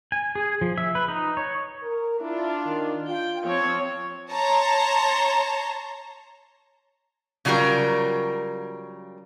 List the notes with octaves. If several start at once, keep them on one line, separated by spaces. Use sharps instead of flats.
G#5
G#4
F3
E5
B4
D#4
C#5
A#4
D4 E4 F4
D#3
F4 G5
F3 C4 C#5
C#5 A5 A#5 C6
C#3 F#3 G3 F4 A#4